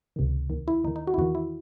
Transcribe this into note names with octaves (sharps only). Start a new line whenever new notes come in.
C#2 C3 D#3
D#2 D#3
E4
D#2 D#3 D#4
D#4
F#4
E4
E2 D#3 F#4
E4